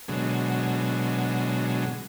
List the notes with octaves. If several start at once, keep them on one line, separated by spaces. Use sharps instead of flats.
B2 D3 F#3 G#3